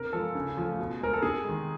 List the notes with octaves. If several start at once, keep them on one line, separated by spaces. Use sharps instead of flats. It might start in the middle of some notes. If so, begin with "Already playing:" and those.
Already playing: C3 A#4
F3 G#3 A4
C#3
F3 A3
B2
G#3 A#4
A4
C3 G#4
D#3 G#3